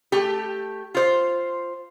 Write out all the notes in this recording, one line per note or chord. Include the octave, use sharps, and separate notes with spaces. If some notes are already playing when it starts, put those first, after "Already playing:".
A3 G4
F4 C5